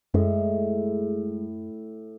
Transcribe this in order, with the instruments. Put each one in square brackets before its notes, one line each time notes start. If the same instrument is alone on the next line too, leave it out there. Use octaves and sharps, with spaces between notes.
[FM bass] F#2 [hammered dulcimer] A2 [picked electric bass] G#3